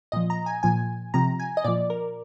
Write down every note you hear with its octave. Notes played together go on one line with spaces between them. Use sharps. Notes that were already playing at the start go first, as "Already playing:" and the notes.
A#2 F3 D#5
A#5
G#5
A#2 F3 G#5
C3 F3 A#5
G#5
D#5
A#2 F3 D5
A#4